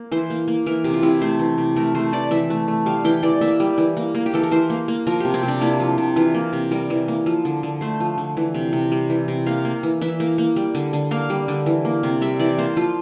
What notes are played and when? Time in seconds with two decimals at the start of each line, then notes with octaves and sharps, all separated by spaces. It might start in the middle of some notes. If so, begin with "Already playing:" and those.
Already playing: A#3
0.12 E3 C5
0.30 A#3
0.48 A#3
0.66 E3 A#4
0.84 C3 G4
0.93 F4
1.02 C3 E4
1.21 A3 C5
1.39 E3
1.58 C3
1.76 A3 A#4
1.95 A3 C5
2.13 E3 D5
2.31 E3 E5
2.50 A3
2.68 A3
2.86 G3 F5
3.04 E3 G5
3.23 E3 D5
3.41 A#3 E5
3.60 G3
3.78 E3
3.97 A#3
4.15 A#3
4.26 G4
4.33 E3 A4
4.43 A#4
4.51 E3 C5
4.70 A#3
4.88 A#3
5.07 F3 A#4
5.20 C3 G4
5.34 C4
5.43 C3 D4
5.61 A#3 E4
5.80 F3
5.98 C3
6.16 E3 F4
6.34 A#3
6.53 C3
6.71 G3 A#4
6.90 E3
7.08 A#3
7.26 F3
7.45 D3
7.63 D3
7.81 A3 C5
8.00 F3
8.18 D3
8.37 E3
8.55 C3
8.73 C3
8.92 G3
9.10 E3
9.28 C3
9.46 A#3 F5
9.65 A#3
9.83 E3
10.01 E3 E5
10.20 A#3
10.38 A#3
10.56 G3
10.75 D3
10.93 D3
11.11 A#3 F5
11.30 G3
11.48 D3
11.66 E3
11.85 A#3
12.03 C3
12.21 G3 E5
12.39 E3 D5
12.58 A#3 C5
12.77 F3 F4